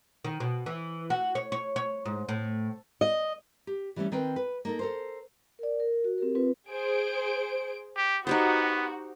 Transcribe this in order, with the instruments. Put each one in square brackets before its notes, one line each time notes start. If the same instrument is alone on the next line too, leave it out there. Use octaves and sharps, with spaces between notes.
[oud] D#3
B2
E3
F#4
C#5
C#5
C#5
G#2
A2
[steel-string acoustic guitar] D#5
[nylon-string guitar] G4
E3 G3 A3 A#3 C#4
D#3 C4 B4 G5
B4
A#3 D#4 A4
A4 A#4 C5
[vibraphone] A#4 D5
A#4
F#4
C4 G4 A#4
C4 F4 B4
[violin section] G#4 C5 D7
[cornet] G4
[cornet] B3 [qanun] D#4 G4 C5 [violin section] F#4